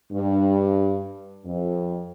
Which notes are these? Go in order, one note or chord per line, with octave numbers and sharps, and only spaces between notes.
G2
F2